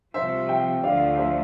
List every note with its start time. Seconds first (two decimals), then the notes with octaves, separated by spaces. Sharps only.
0.14 C2 C3 F3 C5 E5
0.48 E5 G5
0.83 D2 D3 F3 D5 F5
1.17 C5 E5